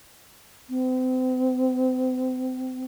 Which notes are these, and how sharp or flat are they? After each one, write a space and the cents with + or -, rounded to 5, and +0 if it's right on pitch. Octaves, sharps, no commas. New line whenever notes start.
C4 -35